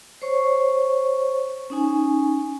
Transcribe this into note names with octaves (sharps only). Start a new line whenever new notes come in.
C5 C#5 C#6
C#4 D#4 G#5